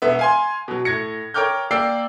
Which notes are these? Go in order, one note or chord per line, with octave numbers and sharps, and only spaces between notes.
E1 B3 E5
F5 G#5 C6
B2 F#3
A2 G#6 A#6 C#7
A#4 C#5 G5 D6 F6 G6
A#3 D5 G5 E6 C7